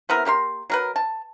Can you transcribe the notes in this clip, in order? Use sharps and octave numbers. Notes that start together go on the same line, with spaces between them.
C3 B3 E4 A#4
A#3 G4 A#4 C6
F#3 A#4 B4
A5